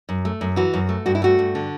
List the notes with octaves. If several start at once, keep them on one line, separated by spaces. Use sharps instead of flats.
F#2
A3
F#2
E3 F#4
F#2
A3
G2 F#4
E4
A3 F#4
G2
D3